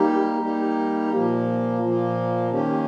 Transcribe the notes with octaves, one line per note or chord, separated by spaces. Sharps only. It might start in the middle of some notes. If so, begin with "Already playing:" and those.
Already playing: G3 A#3 D#4 G4
G3 A#3 D#4 G4
A#2 F3 A#3
A#2 F3 A#3
D#3 A#3 C#4 G4